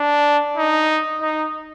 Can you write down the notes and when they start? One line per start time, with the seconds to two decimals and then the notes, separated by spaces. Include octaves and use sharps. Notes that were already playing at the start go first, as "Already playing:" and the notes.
Already playing: D4
0.57 D#4
1.21 D#4